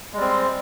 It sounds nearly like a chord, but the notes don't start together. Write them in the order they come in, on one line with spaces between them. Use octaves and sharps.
G#3 G3 C4